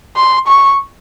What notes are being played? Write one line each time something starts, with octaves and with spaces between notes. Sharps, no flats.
C6
C#6